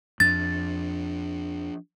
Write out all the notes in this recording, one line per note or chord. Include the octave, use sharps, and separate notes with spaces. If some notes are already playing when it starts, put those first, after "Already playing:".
F2 F3 D4 A6